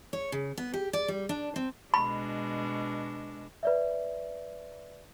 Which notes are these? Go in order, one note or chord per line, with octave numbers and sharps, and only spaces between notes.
C#5
C#3
B3
G4
D5
G3
D4
C4
B2 G#3 D4 B5
B4 D5 E5